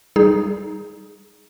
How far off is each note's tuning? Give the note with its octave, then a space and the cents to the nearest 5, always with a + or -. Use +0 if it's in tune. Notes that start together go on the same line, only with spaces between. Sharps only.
G3 +0 D#4 +0 G#4 +0